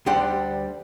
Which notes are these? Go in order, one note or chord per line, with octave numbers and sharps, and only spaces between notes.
D2 G3 D4 F#5 G5 C6